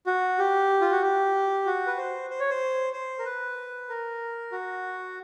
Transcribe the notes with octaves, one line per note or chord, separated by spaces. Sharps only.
F#4
G4
F4
F#4
G4
F#4
B4
C5
C5
C#5
C5
C5
A#4
B4
A#4
F#4